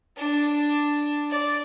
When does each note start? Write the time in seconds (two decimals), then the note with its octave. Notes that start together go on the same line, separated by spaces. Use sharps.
0.17 D4
1.31 D5